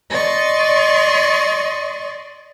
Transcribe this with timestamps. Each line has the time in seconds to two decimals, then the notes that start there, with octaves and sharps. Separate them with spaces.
0.11 D5 D#5 C6 C#6